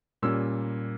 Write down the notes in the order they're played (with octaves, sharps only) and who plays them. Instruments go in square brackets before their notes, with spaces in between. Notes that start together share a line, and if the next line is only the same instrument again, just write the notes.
[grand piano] A#2 G3 C#4 E6